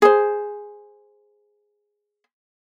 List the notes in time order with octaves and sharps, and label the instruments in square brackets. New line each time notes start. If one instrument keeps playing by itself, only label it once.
[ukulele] G#4 C5